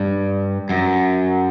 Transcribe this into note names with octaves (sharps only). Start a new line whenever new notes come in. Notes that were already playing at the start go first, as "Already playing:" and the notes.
Already playing: G2
F#2